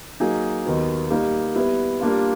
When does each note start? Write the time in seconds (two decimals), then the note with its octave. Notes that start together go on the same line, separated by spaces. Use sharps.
0.20 F#3 A#3 D#4 G#4
0.65 D#2 D#3 F#3 B3
1.10 G3 A#3 D#4
1.55 G3 B3 E4
2.00 G3 A#3 D4 F4